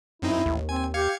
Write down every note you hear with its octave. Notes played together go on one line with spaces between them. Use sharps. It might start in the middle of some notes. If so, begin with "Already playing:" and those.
F#2 C4 D#4 E4
A1 D#2
C4 G#5
G4 F5 G#6 C#7